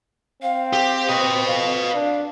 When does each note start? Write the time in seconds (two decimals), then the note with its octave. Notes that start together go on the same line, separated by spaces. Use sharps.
0.42 C4 F5
0.73 G4
1.09 B4 D#5
1.47 F2 F5
1.94 D4